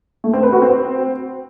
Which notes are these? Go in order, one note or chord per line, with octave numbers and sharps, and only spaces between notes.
A3
C4
B4
F#4
C4